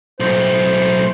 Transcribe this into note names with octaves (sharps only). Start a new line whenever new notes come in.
B1 A2 C5